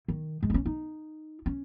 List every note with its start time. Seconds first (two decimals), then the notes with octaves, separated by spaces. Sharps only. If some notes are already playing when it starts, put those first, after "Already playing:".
0.08 D#3
0.43 G#3
0.50 D#4
0.54 C#4
0.66 D#4
1.46 C#4